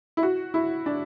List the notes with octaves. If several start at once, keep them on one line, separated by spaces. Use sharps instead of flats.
E4
F#4
E4
D4